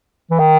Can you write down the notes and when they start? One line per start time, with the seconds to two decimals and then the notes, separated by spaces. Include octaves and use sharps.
0.31 E3
0.39 D#3